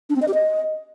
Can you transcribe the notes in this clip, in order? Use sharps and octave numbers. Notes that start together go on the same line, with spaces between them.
D4
C4
D#5
G4
D#5